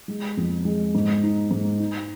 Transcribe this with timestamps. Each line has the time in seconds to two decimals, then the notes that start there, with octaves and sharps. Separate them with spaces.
0.08 G#3
0.37 F2
0.65 G#3
0.95 G#2
1.23 D#4
1.51 G#2
1.79 D#4